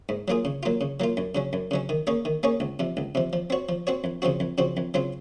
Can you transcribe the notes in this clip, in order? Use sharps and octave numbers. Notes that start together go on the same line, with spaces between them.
G#2
F#3 A#3 F4 G#4
C#3
F#3 A#3 F4
C#3
F#3 A#3 F4
F#2
C#3 F#3 C#4
F#2
C#3 F#3 C#4
D#3
A#3 C#4 G#4 C#5
D#3
A#3 C#4 G#4 C#5
C#2
C3 F3
C#2
C3 F3
F3
C4 F#4 C#5
F3
C4 F#4 C#5
F2
C#3 F3 C4 F#4
F2
C#3 F3 C4 F#4
F2
C#3 F#3 C4 F4